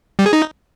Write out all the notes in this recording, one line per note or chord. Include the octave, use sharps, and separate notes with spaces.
G3
G#4
D#4